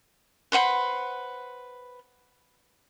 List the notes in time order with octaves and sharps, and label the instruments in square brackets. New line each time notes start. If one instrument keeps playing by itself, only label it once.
[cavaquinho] B4 C5 F#5 B5